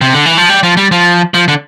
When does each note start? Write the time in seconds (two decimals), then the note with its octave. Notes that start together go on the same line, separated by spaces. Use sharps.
0.01 C3
0.13 D3
0.26 E3
0.38 F3
0.49 G3
0.63 F3
0.77 G3
0.92 F3
1.34 F3
1.48 D3